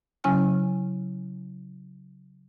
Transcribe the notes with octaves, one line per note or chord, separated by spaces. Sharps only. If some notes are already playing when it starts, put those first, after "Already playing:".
C#3 F#3 C#4 E4 G#5 F6